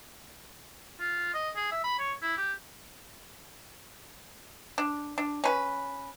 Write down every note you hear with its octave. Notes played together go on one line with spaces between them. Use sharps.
F4
D#5
G#4
E5
B5
C#5
E4
G4
D4
D4
C#4 B4